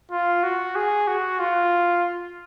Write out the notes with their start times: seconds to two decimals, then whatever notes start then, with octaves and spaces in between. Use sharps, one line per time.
0.12 F4
0.43 F#4
0.76 G#4
1.07 F#4
1.39 F4